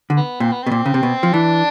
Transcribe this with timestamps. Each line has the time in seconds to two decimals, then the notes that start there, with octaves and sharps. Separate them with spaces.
0.10 D3
0.17 B3
0.40 A#2 C4
0.52 B3
0.63 B2 C4
0.72 A#2
0.86 C#3
0.94 C3
1.03 B2
1.23 F3
1.33 E3 D4